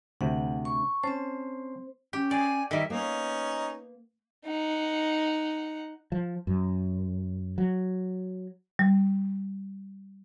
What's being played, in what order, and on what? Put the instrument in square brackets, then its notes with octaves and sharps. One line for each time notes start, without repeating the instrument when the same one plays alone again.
[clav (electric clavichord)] D2 C3 [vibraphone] F#5
[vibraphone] C#6
[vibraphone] C4 C5 [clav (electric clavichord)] C#4 A5
[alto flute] C#4 [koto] G4
[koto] D5 [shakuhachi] G#5
[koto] D#3 G3 [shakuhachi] E5
[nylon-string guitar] A#3 B3 [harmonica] C#4 D#4
[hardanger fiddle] D#4 F#5
[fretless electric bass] F3
F#2
F#3
[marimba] G3